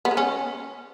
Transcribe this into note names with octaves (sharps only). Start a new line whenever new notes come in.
B3
G#3
C#4